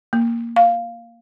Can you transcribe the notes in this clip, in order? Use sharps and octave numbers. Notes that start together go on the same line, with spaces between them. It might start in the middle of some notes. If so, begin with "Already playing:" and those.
A#3
F5